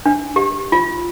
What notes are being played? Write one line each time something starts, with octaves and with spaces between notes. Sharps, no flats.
D4
G4
F4